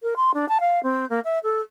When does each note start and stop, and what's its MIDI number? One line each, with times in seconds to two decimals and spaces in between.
0.03 0.14 70
0.16 0.31 84
0.34 0.48 62
0.49 0.58 81
0.60 0.82 77
0.83 1.08 60
1.09 1.20 58
1.24 1.39 76
1.43 1.61 69